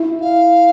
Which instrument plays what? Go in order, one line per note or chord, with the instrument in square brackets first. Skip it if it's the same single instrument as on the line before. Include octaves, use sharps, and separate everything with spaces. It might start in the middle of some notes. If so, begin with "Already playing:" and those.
Already playing: [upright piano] E4
[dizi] F5